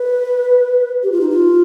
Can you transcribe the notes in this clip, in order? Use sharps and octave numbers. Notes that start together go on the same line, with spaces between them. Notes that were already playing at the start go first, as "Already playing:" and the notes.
Already playing: B4
G4
F4
D#4
F4